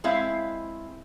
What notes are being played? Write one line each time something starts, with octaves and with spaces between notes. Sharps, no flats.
G#3 C4 E4 E5 F5